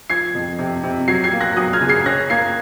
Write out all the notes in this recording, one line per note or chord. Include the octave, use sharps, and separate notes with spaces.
F3 G#6 C7
F2
C3
C3
F#3 G#6 C7
G#6 C7
A#3
F#6 A#6
F#3 D#6 F#6
F6 G#6
C#3
G#6 C7
C#4 F#6 A#6
A#3 G#6 C7